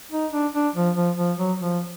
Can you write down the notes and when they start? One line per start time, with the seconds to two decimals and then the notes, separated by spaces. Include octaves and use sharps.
0.12 D#4
0.32 D4
0.53 D4
0.75 F3
0.96 F3
1.18 F3
1.38 F#3
1.59 F3